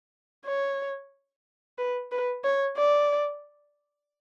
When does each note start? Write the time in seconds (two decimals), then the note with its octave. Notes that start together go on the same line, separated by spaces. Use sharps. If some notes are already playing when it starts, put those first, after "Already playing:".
0.46 C#5
1.78 B4
2.12 B4
2.44 C#5
2.77 D5